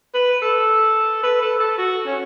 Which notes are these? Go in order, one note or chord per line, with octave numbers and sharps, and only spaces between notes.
B4
A4
B4
A4
A4
F#4
C#4